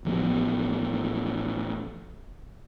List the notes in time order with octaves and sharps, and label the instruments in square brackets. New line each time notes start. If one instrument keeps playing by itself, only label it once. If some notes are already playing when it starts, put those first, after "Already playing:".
[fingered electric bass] A1 F3 G#3 B3